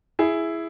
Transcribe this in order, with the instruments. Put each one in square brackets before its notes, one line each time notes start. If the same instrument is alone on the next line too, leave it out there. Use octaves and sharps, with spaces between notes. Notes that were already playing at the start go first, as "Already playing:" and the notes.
[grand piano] E4 G#4